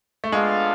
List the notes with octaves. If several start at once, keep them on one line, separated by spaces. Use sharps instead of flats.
A3
G#3 B3 D4 F4 A4 F5